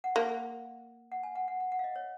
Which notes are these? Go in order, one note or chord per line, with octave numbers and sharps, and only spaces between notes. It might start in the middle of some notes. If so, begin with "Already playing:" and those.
F#5
A#3 F5
F#5
G#5
F#5
F#5
F#5
F#5
F5
D#5
C#5